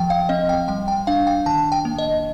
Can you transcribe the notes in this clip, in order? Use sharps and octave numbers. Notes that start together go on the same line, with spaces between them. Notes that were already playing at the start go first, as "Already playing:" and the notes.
Already playing: F3 G5
F5
C4 D#5
G5
G3 G5
G5
D4 F5
G5
D#3 A5
G5
A#3
D#5